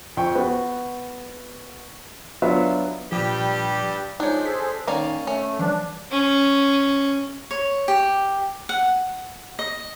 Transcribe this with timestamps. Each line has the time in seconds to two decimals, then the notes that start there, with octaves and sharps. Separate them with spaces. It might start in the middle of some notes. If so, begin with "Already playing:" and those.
0.17 F2 G5 C#6
0.35 B3 F#4
2.42 F#3 B3 D4 F4 E5 F5
3.12 G2 A#2 F3 G3 G4
4.20 F3 G#3 D4 D#4 C#5 G6
4.46 G#4 A4 C5 B6
4.87 D#3 A#3 C#4 D5
5.27 A3 C#4
5.59 E3 F3 G3 D4
6.11 C#4
7.51 C#5
7.88 G4
8.69 F#5
9.59 D#5